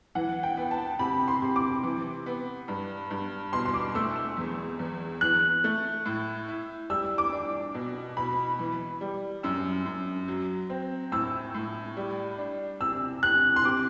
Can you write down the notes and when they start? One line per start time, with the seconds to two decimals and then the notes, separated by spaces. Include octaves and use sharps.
0.15 E3 F#5
0.43 G5
0.57 B3
0.71 A5
0.99 C3 B5
1.28 C6
1.42 C3
1.56 D6
1.83 E3
2.26 B3
2.68 G2
3.11 G2
3.53 B2 C6
3.65 C6
3.74 D6
3.95 A3 E6
4.16 E6
4.37 E2
4.79 E2
5.21 E3 F#6
5.64 A3
6.06 A2
6.48 E4
6.90 G3 E6
7.18 D6
7.32 D4
7.74 B2
8.17 B2 B5
8.59 E3
9.01 G3
9.43 F#2 E6
9.86 F#2
10.28 F#3
10.70 C4
11.12 A2 E6
11.54 A2
11.97 G3
12.38 D4
12.81 C3 E6
13.23 C3 F#6
13.56 C6
13.65 C3 D6